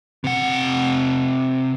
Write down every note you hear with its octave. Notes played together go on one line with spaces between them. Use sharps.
C3 F#5